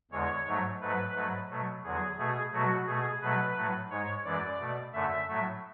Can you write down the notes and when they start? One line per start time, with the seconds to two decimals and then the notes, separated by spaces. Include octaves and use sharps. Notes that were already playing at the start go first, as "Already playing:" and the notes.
0.12 E2 D3 G#3 C#5
0.46 G#2 F#3 A3
0.81 G#2 F#3 A3 B4
1.15 G#2 F#3 A3
1.49 B2 F#3 A3
1.84 E2 D3 F#3 G#4
2.18 B2 A3 G#4
2.52 B2 F#3 A3 F#4
2.87 B2 A3 G#4
3.21 B2 F#3 A3 B4
3.56 A2 F#3 A3
3.90 G#2 G#3 C#5
4.25 F#2 E3 G#3 D5
4.59 B2 A3
4.93 F#2 D3 A3 E5
5.27 A2 F#3 A3